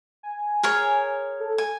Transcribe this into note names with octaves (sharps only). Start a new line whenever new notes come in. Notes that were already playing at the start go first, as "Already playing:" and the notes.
G#5
G#4 A#4 C#5
A4
G#5